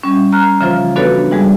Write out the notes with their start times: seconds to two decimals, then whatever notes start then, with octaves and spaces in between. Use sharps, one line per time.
0.03 G3 C#4
0.32 A#5 F6 F#6
0.61 C#3 E3 F3 F4 C5
0.96 B3 D4 F#4 A4 B4 C#5
1.31 E3 G3 G#3 G#4